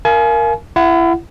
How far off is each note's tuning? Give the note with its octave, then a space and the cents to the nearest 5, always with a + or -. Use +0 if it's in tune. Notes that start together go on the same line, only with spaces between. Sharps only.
A#4 +0 F5 -30 G#5 +35
E4 +30 F#5 +0